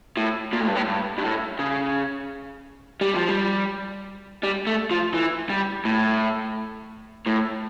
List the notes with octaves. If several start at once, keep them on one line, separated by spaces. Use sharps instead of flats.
A2
A#2
A2
G2
A2
G2
G2
A2
C#3
G3
F3
G3
G3
A3
F3
E3
G3
A2
A2